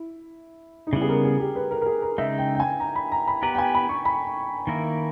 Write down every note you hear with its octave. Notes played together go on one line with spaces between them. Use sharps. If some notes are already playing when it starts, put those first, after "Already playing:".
Already playing: E4
D#4
C#3 G3 B3 E4
G#4
A#4
G#4
G4
B4
A#4
A#4
G#4
A#4
C#3 G#3 D#4 E5
G5
G5
G#5
A#5
B5
A#5
B5
B3 G4 B4 A#5
G5
G#5
B5
C#6
B5
D#3 A#3 E4 A#4